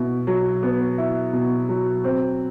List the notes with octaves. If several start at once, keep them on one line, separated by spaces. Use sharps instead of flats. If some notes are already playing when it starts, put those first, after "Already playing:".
Already playing: B2 E4
F#3
B3
E4
B2
F#3
C4